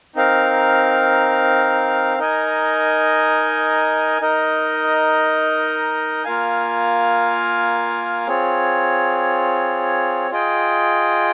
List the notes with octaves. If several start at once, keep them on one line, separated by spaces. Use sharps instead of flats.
C4 D#4 A#4 F5
D#4 A#4 D#5 G#5
D#4 A#4 D#5
A#3 F4 A#4 F5 G#5
C4 F4 G#4 C#5
F4 G#4 D#5 G5